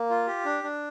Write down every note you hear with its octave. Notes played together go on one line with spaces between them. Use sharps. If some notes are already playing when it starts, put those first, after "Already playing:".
Already playing: A#3
F4
G4
D4
D4